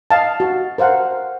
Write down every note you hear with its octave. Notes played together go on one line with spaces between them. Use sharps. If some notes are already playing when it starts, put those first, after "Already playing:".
D#5 F5 A5
F#4
A#4 C5 F5 F#5